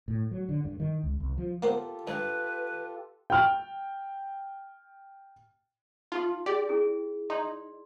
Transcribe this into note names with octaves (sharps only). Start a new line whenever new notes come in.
A2
F#3
D3
G2
D#3
C#2
C2
F3
A#3 B3 F4 G4 A4 C5
G2 B4
G5 F6
D#4 F4 G4 C6
G4 G#4 D5
C#4 E4 G#4
D#4 D5 C6